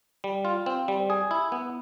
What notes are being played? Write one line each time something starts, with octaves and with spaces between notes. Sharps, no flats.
G3
F4
C4
G3
G#4
E4
B3